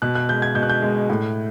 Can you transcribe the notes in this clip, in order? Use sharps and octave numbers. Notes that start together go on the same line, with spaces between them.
B2 F#6
F#6
G#3 G6
G#6
B2 G6
F#6
G6
G#3
A2